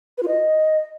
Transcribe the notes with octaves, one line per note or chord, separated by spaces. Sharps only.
B4
F4
D#5